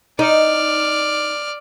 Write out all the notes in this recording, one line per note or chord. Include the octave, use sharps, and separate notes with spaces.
D#4 D5 F6